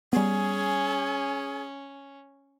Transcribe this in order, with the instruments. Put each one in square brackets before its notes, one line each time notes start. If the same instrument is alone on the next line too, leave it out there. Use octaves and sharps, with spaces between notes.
[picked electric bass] G3 B3 [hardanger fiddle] C#4 [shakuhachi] G#4